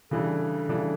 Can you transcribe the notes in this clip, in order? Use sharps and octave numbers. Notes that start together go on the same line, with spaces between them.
C#3 E3 G3 D4 A4
C#3 E3 G3 D4